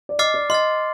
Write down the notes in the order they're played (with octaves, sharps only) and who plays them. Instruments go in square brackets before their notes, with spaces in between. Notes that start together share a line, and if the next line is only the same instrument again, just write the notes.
[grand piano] D5
[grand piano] D#5 [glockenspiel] D6 F6 A6 C7
[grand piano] D5
[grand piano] D#5 [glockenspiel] C6 F6 A6